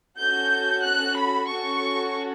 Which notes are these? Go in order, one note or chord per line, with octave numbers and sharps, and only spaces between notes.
C#4 F#4 A4 G6
F#6
B5
C#4 F#4 A4 C#6